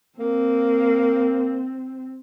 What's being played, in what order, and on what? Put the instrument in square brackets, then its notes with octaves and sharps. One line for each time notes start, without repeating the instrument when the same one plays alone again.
[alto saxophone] A#3 [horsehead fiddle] C4